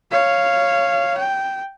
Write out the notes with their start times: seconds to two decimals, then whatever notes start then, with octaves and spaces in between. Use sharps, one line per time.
0.12 C#5 F5
1.18 G5